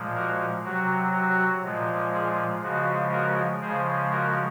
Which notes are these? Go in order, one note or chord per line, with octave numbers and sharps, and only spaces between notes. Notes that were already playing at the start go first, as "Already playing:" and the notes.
Already playing: A#2 F3 G#3
F#4 A#4
C3 F#3 F#4
F#4
A#2 F3 G#3
F4 G#4
C#3 F3 G#3 F#4
F#4 A#4
C#3 F3 G#3 G#4 C5
F#4 A#4